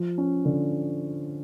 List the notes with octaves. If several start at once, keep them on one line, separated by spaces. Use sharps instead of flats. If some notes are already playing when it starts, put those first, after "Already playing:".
Already playing: F3
C#4
D3